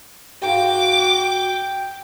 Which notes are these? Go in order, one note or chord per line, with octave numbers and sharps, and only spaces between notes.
G#2 A#3 F#4 G5 C6 D6